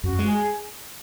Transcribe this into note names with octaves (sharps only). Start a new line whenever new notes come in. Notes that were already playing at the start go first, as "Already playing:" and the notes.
F#2 F#4
G#3
G#4